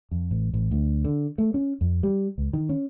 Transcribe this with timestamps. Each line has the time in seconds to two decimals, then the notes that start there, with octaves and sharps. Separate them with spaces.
0.11 F2
0.31 A1
0.54 A1
0.71 D2
1.05 D3
1.38 A3
1.54 C#4
1.81 F2
2.03 G3
2.38 C#2
2.53 D#3
2.69 C#4